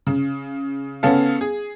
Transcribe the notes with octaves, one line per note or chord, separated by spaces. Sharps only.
C#3
C#3 B3 C#4 A4 F5
G#4